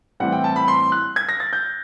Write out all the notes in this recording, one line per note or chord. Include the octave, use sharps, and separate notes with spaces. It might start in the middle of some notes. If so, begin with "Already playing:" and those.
A2 E3 G3 C4 F#5
G5
A5
B5
C6
F#6
G#6
A#6
A6
G6